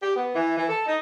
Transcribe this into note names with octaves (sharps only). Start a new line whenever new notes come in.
G4
B3
E3
E3
A4
D#4